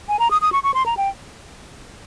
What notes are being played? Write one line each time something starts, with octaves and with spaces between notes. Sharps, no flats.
G#5
A#5
D#6
D#6
C#6
C#6
C6
A#5
G5